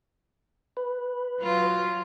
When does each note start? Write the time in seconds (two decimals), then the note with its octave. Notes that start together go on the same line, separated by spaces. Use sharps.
0.77 B4
1.41 F#3 F4